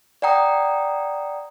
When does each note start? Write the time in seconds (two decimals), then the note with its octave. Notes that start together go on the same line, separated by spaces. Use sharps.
0.22 D5 F#5 G5 A#5 D#6